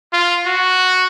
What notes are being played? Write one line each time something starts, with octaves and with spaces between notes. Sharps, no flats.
F4
F#4